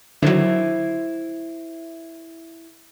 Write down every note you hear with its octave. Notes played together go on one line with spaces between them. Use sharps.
D3 D#3 F#3 E4 C5 E5